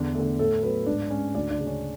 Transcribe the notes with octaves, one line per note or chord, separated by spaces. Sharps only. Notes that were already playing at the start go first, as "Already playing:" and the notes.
Already playing: E2 D3 D4
D3 A3
A2 A3 A4
F#3 A3 B3 B4
G#2 D4 D5
G#3 C#4 C#5
D2 D4 D5
D4 D5
C#3 G#3
C#4 C#5